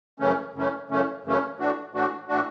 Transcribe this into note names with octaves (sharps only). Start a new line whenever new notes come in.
F#2 C#3 E3 A3 C#4
F#2 C#3 E3 A3 C#4
F#2 C#3 E3 A3 C#4
F#2 C#3 E3 A3 C#4
A2 E3 A3 D4 F#4
A2 E3 A3 D4 F#4
A2 E3 A3 D4 F#4